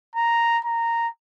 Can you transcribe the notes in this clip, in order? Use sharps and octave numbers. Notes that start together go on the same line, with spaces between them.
A#5
A#5